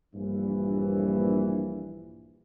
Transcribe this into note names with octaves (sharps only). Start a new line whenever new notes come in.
A#1 G2 E3